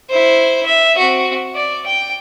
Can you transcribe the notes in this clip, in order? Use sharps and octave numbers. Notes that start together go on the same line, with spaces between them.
E4 C5
E5
C4 F#4
D5
G5